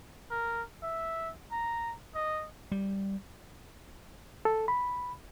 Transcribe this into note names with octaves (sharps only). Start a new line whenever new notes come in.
A#4
E5
A#5
D#5
G3
A4
B5